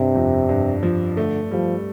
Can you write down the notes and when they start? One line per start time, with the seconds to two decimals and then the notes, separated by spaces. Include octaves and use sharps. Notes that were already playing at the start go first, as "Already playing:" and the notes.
Already playing: G2 C3
0.15 F2
0.49 G2
0.83 F3
1.16 D3 A3
1.51 F3 G3